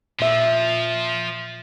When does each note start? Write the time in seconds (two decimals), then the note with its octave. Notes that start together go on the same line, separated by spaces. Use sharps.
0.19 A#2 F3 E5